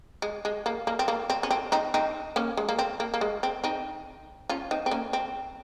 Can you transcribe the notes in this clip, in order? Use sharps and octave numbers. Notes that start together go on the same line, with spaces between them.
G#3
G#3
A#3
A#3
C4
A#3
C4
C#4
C4
C4 D#4
C4 D#4
A#3 C#4
G#3
A#3
C4
A#3
A#3
G#3
C4
C4 D#4
C#4 F4
C4 D#4
C4
A#3 C#4
C4